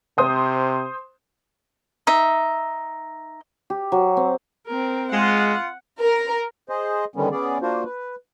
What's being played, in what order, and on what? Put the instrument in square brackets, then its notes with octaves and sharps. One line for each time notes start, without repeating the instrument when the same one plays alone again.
[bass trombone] C3 [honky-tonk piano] C5 D#6
[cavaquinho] D#4 E5
[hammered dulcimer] G4
F#3
C4
[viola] C4 A#4
[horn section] G#3 [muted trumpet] F4 [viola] F#5
[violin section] A#4
[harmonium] G#4 C5 D#5
D3 D#3 G3 B3 C#4
B3 C#4 G#4 D5
A#3 D4 F4 F#4 C5
B4